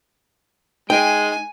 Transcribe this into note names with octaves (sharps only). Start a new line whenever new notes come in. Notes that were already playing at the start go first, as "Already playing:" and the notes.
G#3 D#4 G5 G#5